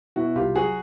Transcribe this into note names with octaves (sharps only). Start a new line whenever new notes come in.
B2 E4 F#4
C2 F4 G4
F#3 F#4 G#4